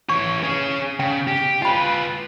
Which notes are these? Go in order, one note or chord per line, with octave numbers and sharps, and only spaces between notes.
E3 C#5 C#6
C#4 G#4
C#3 G5
G4
F4 B4 G5 B5